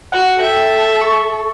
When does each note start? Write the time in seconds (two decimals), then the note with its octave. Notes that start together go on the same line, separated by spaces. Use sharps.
0.12 F#4 F#5
0.41 A4 E5 G5
1.01 C#6